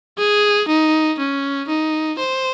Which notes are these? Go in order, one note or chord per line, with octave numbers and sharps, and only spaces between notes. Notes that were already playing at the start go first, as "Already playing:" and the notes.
G#4
D#4
C#4
D#4
C5